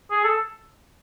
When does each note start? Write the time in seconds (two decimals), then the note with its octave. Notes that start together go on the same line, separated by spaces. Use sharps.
0.11 G#4
0.24 A4